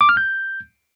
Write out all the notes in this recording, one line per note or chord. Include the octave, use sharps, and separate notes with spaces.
D6
F6
G6